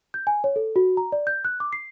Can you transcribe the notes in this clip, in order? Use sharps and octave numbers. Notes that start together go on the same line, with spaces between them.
G6
G#5
C#5
A4
F#4
A#5
D5
G6
F#6
D6
C7